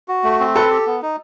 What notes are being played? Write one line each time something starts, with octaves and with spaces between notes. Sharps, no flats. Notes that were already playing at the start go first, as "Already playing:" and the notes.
F#4
A3
C4
A4 B4
G4
B3
D#4